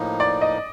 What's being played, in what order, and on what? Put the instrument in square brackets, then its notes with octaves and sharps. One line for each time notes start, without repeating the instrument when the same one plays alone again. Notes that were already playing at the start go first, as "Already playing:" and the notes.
Already playing: [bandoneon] A2 F3 A#3 D#4
[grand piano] D5
D#5